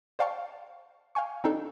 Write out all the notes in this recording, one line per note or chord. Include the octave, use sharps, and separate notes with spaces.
C5 D5 F5 G5 A5 C#6
F5 G5 G#5 C#6
C4 D4 D#4 A4